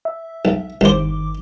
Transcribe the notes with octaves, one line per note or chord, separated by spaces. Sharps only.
E5
B1
G1 C2 D#3 C5 D6